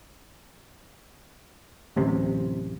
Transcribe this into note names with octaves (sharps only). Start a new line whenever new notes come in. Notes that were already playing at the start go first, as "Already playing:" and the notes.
D1 A1 C3